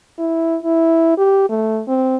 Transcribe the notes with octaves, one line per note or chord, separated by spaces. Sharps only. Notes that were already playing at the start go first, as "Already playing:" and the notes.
E4
E4
G4
A3
C4